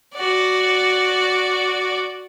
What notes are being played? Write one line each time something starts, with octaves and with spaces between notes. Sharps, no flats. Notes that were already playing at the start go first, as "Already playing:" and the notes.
F#4 D5